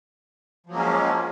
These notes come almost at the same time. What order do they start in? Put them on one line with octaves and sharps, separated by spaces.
F3 F#3 A#3 G#3 C#4